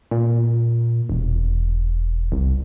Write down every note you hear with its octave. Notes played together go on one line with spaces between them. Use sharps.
A#2
E1
C2